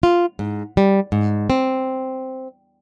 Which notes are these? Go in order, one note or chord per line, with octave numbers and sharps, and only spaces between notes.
F4
G#2
G3
G#2
C4